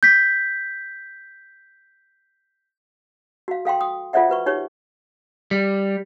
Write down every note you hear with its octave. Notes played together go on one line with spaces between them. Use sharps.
G6 B6
F#4 F5
A4 F5 G5 C6
D#6
F4 A4 C5 D5 E5 F#5
F#4 B4 C#6
D#4 G4 C#5 C#6
G3